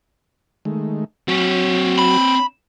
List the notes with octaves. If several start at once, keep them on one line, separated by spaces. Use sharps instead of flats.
D#3 G#3 A3
F#3 C4 F#4 C#5
B5